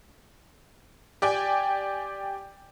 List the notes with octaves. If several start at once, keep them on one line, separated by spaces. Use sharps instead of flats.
G4 D5 G5 G#5